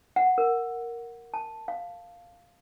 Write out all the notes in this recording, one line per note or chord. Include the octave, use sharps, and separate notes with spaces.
F#5
A#4
A5
F5